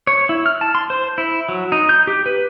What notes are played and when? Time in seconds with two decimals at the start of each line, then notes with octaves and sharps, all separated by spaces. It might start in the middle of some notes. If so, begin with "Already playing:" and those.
0.07 C#5
0.29 E4
0.46 F6
0.61 A5
0.75 C6
0.90 C5
1.18 E4
1.49 F#3
1.72 D#4
1.89 G6
2.07 G4
2.26 B4